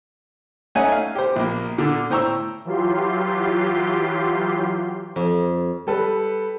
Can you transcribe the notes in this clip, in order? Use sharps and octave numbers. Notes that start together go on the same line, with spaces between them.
A3 C#4 D#4 F#5 G#5
F5
G4 C5
A#1 A#3
A#2 D3
A2 C5 G5 A#5 C#6 E6
E3 F#3 F4 G4 C6
F2
G3 A4 B4